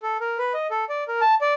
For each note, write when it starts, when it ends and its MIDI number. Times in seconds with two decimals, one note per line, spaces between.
0.03 0.17 69
0.20 0.38 70
0.38 0.53 71
0.54 0.67 75
0.71 0.85 69
0.89 1.04 74
1.08 1.21 70
1.21 1.35 81
1.41 1.54 74